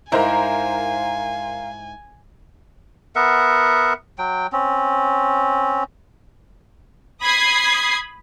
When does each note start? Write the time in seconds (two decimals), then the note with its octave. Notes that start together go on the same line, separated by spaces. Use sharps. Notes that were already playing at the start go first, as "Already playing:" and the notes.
0.12 G#2 E4 A#4 C5 F5 G#5 A#5
3.16 B3 A#4 E5 F#5
4.18 F#3 G5
4.52 C4 C#4
7.22 B5 D#6 G#6 C7